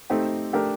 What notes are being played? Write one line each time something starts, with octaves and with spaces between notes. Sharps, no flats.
A3 C4 D#4 G4
A3 D4 G4 A#4